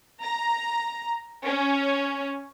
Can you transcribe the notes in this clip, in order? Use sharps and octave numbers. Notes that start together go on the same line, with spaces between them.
A#5
C#4